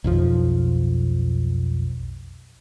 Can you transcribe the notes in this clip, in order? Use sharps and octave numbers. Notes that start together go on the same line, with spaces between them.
B1 F2 F3